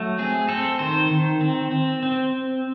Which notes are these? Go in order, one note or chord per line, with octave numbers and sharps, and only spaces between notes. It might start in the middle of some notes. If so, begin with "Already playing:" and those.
Already playing: F#3 A3
C4 G#4
C4 A4
D#3 C5
D#3
C4
C4
C4